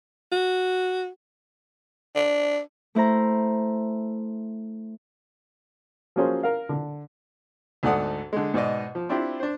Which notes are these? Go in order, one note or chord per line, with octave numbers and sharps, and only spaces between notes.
F#4
D4
A3 E4 C5 A#5
F3 F#3 A#3 C#4 G#4 C5
A#4 F5
D3
D2 G#2 A4 D5 F#5 D#6
D3 G#3
G#2 B2 D5 D#5
F3
C4 D4 E4 F4 G4
D4 C5